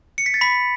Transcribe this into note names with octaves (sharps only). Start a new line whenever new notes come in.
C#7
B6
A6
B5 B6